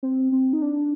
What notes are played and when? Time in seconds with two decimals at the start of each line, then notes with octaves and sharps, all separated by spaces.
0.03 C4
0.32 C4
0.53 D#4
0.62 D4